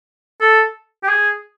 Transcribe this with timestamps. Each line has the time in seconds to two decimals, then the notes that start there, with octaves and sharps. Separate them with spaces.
0.41 A4
1.03 G4
1.08 G#4